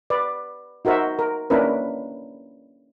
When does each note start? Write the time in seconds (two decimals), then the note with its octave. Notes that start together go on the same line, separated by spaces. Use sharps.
0.10 B4 D5
0.85 D#4 F#4 A#4 C5 E5
1.19 A#4
1.50 A#3 C#4 D4 E4 A#4 B4